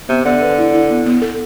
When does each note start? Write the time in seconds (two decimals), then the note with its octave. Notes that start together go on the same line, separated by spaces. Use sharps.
0.09 C3 B3
0.25 D3 B3
0.41 B4
0.58 E4
0.73 E4
0.90 B3
1.06 B3
1.22 A4